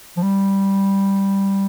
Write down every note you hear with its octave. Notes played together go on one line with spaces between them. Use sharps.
F3
G3